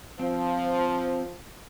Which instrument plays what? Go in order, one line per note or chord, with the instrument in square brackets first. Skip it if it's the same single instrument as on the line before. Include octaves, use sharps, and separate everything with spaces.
[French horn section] F3 [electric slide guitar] C4